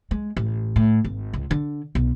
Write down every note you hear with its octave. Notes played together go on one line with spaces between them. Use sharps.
G#3
A1
A2
G#1
C#2
D3
B1